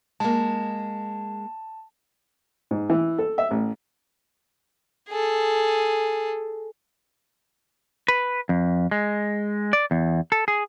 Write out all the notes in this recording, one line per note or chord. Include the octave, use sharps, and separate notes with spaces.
G#3 A#3 A5
G#2
E3
A4
E5
A1
G#4 A4
B4
F2
G#3
D5
E2
A4
G#4